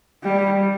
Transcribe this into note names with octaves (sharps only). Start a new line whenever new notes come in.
G3